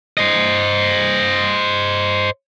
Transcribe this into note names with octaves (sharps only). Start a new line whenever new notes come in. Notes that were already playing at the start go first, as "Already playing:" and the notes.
C5 D#5